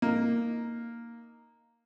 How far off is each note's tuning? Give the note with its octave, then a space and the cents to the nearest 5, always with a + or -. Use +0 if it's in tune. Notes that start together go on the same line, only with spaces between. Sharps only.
A#3 +0 D#4 +0